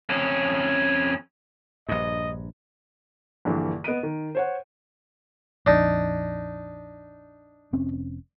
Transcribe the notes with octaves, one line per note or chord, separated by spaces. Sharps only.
F2 C#4
A#1 G2 D#5
A#1 G2 D3 E3
B3 D#5 D7 D#7
D#3
C5 C#5 F#5
A#1 F2 D4 D#4
F1 C4 C#4